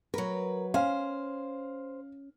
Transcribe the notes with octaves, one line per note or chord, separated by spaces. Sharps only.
F#3 A#4 B4
C#4 C5 F5